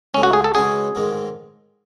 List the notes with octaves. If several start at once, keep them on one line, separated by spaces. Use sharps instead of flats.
C#2 C#3 F#3 A3 C#4
F#4
G#4
A4
C#3 E3 G#3 C#4 F#4 G#4
A1 G#2 D#3 G#3